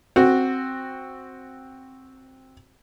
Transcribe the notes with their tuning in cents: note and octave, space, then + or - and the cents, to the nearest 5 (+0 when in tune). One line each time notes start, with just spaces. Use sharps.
C4 +5 F#4 +0